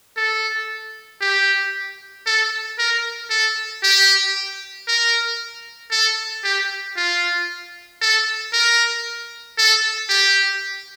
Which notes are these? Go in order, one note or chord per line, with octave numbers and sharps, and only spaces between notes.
A4
G4
A4
A#4
A4
G4
A#4
A4
G4
F4
A4
A#4
A4
G4